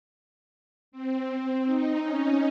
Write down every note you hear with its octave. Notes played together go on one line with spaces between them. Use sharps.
C4
D#4
C#4